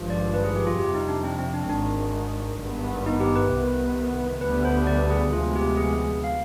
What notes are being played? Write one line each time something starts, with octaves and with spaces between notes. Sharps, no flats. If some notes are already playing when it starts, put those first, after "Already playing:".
Already playing: G#1 G2 F3
D5
B4
G#4
G4
F4
F2 C3 G3 G4
D#4
D4
C4
C4
D4
C4
G#1 G#2 D#3 D4
G#1 G2 D#3 B3
D#4
G4
B4
C2 C3 D#3 B3
D2 D3 G3 B3 B4
C5
D5
G#4
D2 C3 F3 G#3 B3 F4
G4
G#4
F5